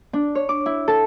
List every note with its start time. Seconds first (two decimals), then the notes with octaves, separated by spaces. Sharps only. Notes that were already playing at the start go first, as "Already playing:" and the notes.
0.13 D4
0.35 C#5
0.49 D6
0.66 E4
0.88 A4